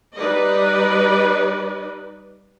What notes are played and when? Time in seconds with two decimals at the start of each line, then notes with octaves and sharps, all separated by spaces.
0.16 G3 D#4 B4 D5 D#5